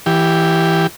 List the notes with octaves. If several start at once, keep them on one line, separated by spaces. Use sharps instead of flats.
E3 G4